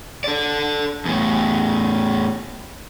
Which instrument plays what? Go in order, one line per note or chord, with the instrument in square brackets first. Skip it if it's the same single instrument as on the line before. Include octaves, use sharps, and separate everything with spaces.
[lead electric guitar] A4 D5
E2 A2